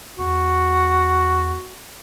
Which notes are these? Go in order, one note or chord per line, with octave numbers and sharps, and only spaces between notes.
E2 F#4